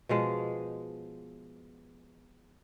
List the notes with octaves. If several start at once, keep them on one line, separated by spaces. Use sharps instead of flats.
B2 F3 G#3